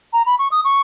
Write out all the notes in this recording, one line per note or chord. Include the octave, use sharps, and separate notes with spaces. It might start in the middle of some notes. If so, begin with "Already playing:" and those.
A#5
B5
C#6
D#6
C#6